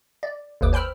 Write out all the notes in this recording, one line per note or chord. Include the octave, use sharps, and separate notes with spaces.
D5
G1 D#2 B4 D6
C5 G5 B5 E6 F6